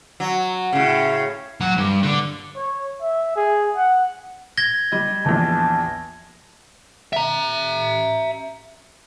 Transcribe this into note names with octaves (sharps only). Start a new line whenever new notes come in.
F#3
A2 C#3
F#3 F#5
G2
D3
C#5
E5
G#4
F#5
G#6 A#6 G7
G3 D#5
A#1 E2 A5
E5 A#5